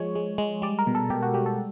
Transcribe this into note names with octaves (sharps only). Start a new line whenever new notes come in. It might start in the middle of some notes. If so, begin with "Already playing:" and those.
Already playing: F3 G#3 C#5
G#3
G#3
G3 D5
A#4
B2
A4
B2 G4
F#4
G3 G4
A4